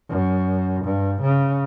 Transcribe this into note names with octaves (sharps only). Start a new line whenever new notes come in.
F#2
G2
C#3